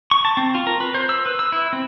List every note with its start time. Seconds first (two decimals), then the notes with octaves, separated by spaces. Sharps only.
0.11 C#6
0.25 A5
0.37 C4
0.55 F4
0.67 A#4
0.80 B4
0.94 C5
1.09 E6
1.26 B4
1.39 E6
1.52 E4
1.73 C4